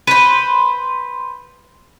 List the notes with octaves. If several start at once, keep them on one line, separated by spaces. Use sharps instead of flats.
B4 C5